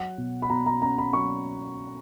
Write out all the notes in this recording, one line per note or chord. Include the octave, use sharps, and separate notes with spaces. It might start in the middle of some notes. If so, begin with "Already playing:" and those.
Already playing: F#3 F#5
B2
B5
B2 A#5
A#5
C#4 A#5
B5
F#3 C#6